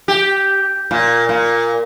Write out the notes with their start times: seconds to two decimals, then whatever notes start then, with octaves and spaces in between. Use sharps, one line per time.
0.08 G4
0.91 A#2
1.29 A#2